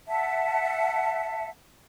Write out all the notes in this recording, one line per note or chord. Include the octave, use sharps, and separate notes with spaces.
E5 F#5 A5